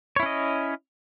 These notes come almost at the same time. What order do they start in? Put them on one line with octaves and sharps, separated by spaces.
C#5 E4 C#4 D#5